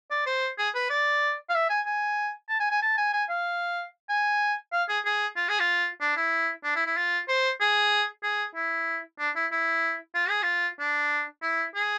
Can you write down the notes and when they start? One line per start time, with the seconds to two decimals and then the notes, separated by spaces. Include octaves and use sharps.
0.11 D5
0.26 C5
0.58 G#4
0.74 B4
0.90 D5
1.49 F5
1.54 E5
1.70 G#5
1.86 G#5
2.49 A5
2.60 G#5
2.71 G#5
2.82 A5
2.98 G#5
3.13 G#5
3.29 F5
4.09 G#5
4.72 F5
4.88 G#4
5.05 G#4
5.36 F4
5.48 G#4
5.59 F4
6.00 D4
6.16 E4
6.63 D4
6.75 E4
6.86 E4
6.97 F4
7.28 C5
7.60 G#4
8.23 G#4
8.55 E4
9.19 D4
9.35 E4
9.52 E4
10.14 F4
10.29 G#4
10.42 F4
10.79 D4
11.42 E4
11.74 G#4